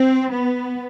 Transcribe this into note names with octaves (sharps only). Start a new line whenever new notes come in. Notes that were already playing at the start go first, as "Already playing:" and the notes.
Already playing: C4
B3